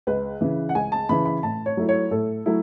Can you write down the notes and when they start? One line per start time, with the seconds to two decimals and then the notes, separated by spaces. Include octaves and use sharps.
0.07 C#2 B4
0.41 C#3 E3
0.69 F#5
0.75 C#2 G#5
0.92 A5
1.09 C#3 E3 B5
1.26 B5
1.43 A2 A5
1.66 C#5
1.77 F#3 A3 E4
1.89 C#5
2.11 A2 A4
2.46 F#3 A3 E4